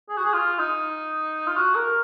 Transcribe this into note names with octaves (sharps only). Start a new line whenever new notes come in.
G#4
F#4
G#4
F4
D#4
F4
F#4
A#4